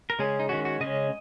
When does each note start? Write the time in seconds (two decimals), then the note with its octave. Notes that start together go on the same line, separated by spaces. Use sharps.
0.10 A#4
0.19 C#3 G#3 C#4 G#4
0.40 D#4
0.49 D#3 G#3 C#4 F#4
0.65 F#4
0.80 C#3 G#3 C#4 D#5